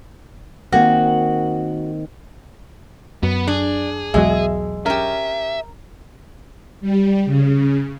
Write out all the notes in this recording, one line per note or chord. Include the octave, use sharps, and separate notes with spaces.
D#3 A#3 C4 F#4
F#2 B3
D4 G#4
B1 E2 F#3 G#3 E5
C#4 G4 A#4 E5
G3
C#3